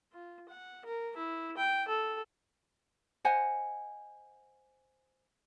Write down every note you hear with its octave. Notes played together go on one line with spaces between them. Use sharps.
F4
F#5
A#4
E4
G5
A4
C5 D#5 F#5 G#5